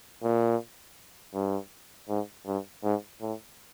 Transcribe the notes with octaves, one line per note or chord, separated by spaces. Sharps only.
A#2
G2
G#2
G2
G#2
A2